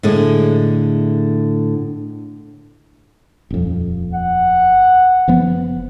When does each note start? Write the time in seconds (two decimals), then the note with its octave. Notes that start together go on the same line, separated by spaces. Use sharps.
0.03 A2 D3 G#3
3.50 D#1 F2
4.13 F#5
5.28 F#1 F3 B3